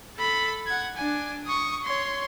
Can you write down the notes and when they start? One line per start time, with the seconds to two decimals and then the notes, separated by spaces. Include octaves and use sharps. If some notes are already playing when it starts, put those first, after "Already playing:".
0.17 A4 B5
0.67 F#5 G#6
0.97 D4 G#5
1.46 C#6 D#6
1.84 C#5 C6